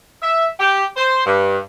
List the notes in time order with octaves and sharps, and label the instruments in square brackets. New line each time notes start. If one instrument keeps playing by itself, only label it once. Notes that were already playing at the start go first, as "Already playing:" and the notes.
[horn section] E5
G4
C5
G2